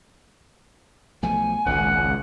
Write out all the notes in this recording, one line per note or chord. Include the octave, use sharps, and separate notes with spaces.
B1 F3 A3 G#5
G#1 C#2 A#2 F#5